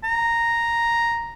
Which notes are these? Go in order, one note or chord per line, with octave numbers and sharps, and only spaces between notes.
A#5